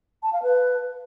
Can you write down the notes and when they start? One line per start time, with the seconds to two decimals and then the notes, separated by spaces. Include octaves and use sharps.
0.23 A5
0.33 F5
0.43 B4